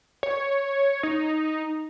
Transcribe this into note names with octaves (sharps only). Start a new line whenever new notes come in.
C#5
D#4